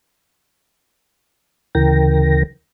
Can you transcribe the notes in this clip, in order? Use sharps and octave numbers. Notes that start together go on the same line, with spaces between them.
D2 C#3 E3 A#4 G5 A#6